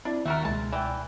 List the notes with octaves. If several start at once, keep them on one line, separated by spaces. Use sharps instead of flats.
C4 D4 E4 D5
D#2 A3 F#4 A#4 E5
C#2 B2 G#3 A5
E3 D5 G5